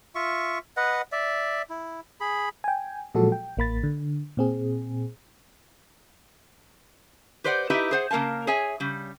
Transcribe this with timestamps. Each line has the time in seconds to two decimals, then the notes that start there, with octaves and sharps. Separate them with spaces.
0.15 F4 E5 C#6
0.77 B4 D#5 F#5
1.12 D5 E5
1.70 E4
2.20 G#4 B5
2.64 G5 G#5
3.15 A#2 F3 F#3 G#3 F#4 A4
3.32 G5
3.57 A1 A#3 B5 A6
3.83 D3
4.37 A#2 C4 G#4
7.44 G4 B4 C5 D5 D#5 F#5
7.70 D#4 E4 G4 B4 D#5 E5
7.91 G#4 C5 F#5
8.11 C#3 A#3 A#4 F5 A5
8.47 G#4 C#5 E5 G#5
8.80 C#3 G3